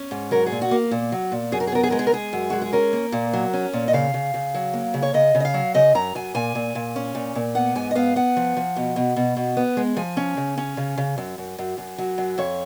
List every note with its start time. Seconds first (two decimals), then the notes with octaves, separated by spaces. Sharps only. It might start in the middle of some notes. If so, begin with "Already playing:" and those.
Already playing: C#4
0.11 G#2
0.31 F#3 A#4
0.46 G#4
0.52 A#2
0.62 F#4
0.71 A#3
0.91 A#2
1.12 F#3
1.32 A#2
1.52 F#2 G#4
1.60 A#4
1.67 G#4
1.72 B3 A#4
1.83 G#4
1.90 G#3 A#4
1.99 G#4
2.07 A#4
2.12 G#3 G#4
2.33 F#2
2.50 G#3 F#4
2.62 G#4
2.73 C#4 A#4
2.93 A#3
3.12 A#2
3.33 F#3
3.53 C#4
3.73 A#2
3.88 D#5
3.93 C#3 F5
4.14 C#3
4.34 C#3
4.54 F#3
4.74 A#3
4.94 C#3
5.02 C#5
5.14 C#3 D#5
5.35 C#3
5.40 D#5
5.45 F5
5.54 F#3
5.74 C#3 D#5
5.95 F#2 A#5
6.15 F#2 G#5
6.35 A#2 G#5
6.55 A#2
6.75 A#2
6.96 C#4
7.15 A#2
7.35 A#2
7.55 B3 F#5
7.75 G#2 G#5
7.91 D#5
7.95 B3 F5
8.16 B3 F#5
8.37 F3
8.57 F3
8.77 B2
8.96 B2
9.16 B2
9.37 B2
9.57 B3
9.77 G#3
9.97 F3 G#5
10.17 C#4
10.37 C#3
10.58 C#4
10.77 C#3
10.98 C#3
11.18 F#2
11.38 F#2
11.58 F#2
11.78 F#2
11.98 F#3
12.18 F#2
12.38 F2 C#5